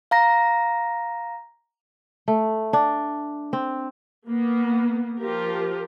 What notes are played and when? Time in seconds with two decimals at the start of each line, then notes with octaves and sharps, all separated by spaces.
0.11 F5 A#5 A#6
2.28 A3
2.73 D4
3.53 C4
4.26 A#3 B3
5.19 F3 F4 G4 A#4